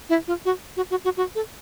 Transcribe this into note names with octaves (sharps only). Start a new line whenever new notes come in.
E4
F4
F#4
F#4
F#4
F#4
F#4
A4